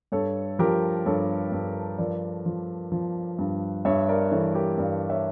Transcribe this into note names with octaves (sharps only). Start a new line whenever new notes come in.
G2 A4 C#5
F3 G4 A#4
G2 A4 C#5
G2
F3 A#4 D5
F3
F3
G2
G2 C#5 E5
A#4 D5
E3 A4 C#5
G4 A#4
G2 D5 F5
C#5 E5